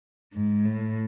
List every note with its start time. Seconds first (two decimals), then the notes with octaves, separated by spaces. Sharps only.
0.34 G#2
0.65 A2